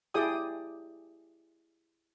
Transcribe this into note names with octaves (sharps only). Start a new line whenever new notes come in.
E4 G4 G#4 D5 G5 D#6